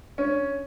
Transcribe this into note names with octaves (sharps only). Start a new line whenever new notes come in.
C#4